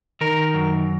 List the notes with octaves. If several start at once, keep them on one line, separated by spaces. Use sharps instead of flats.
D#3 A#4
F#2